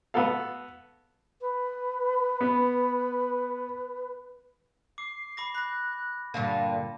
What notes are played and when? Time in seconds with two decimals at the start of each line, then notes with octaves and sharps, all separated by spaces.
0.14 B3 F#4 A4 F5
1.41 B4
2.41 B3
4.98 D6 C7
5.37 B5 D6 A#6
5.55 B5 F#6 A#6
6.34 G2 A#2 D3 F5 A5